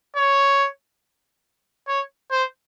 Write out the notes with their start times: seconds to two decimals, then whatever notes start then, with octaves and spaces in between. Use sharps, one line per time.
0.16 C#5
1.88 C#5
2.31 C5